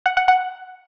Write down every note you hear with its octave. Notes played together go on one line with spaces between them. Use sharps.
F#5
F#5
F#5